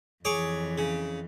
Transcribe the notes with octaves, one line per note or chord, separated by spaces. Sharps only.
F2 E3 G#4 C#5 D6
C#3